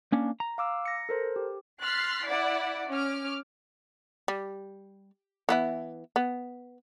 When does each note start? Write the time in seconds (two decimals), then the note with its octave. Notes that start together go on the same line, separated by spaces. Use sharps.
0.12 A#3 C#4 D4
0.40 A#5
0.58 F5 D6 E6
0.86 A#6 C#7
1.09 A4 A#4 C5
1.36 G4
1.82 C6 F6 F#6 A6 B6 C7
2.28 E4 D5 F#5
2.89 C#4 D6 F6
4.28 G3
5.49 E3 B3 E4
6.16 B3